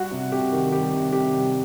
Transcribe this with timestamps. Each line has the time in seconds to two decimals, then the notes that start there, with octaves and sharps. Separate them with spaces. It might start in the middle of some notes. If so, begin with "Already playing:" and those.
Already playing: G3 F#4
0.11 C3
0.32 C3 G4
0.52 D#3
0.72 G3 G4
0.93 C3
1.13 C3 G4
1.33 G3